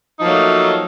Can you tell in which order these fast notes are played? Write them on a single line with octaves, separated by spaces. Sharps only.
D#4 F3 A#3 F#3 A3